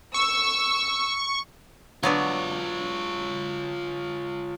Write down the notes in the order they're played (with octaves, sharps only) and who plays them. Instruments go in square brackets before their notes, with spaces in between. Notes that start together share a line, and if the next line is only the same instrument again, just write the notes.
[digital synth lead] C#6 [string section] E6
[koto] F#3 B3 D4 [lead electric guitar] F4 C#5